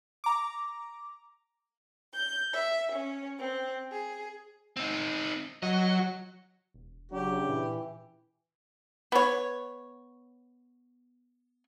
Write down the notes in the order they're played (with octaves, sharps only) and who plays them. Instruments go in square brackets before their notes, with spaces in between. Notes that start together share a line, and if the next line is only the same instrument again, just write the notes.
[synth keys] A#5 D6
[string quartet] G6
E5
C#4
C4
G#4
[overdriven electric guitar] C4 D#4
[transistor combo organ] F#3 [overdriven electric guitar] D#5
[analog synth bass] E1
[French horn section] C#3 C#4 D4 [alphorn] F#3 [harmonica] G4
[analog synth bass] A#2 [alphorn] E3
[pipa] B3 C#5